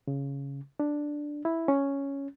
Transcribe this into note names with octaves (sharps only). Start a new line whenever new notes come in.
C#3
D4
E4
C#4